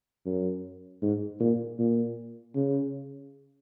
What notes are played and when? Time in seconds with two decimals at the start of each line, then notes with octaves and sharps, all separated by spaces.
0.26 F#2
1.02 G#2
1.40 A#2
1.79 A#2
2.55 C#3